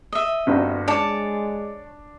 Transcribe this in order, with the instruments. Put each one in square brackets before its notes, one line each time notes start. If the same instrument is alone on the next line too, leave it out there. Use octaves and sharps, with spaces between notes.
[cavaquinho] D#5 E5
[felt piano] G1 G2 F#4 [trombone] C4
[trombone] G#3 [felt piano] D4 [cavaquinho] C#5 D5 A5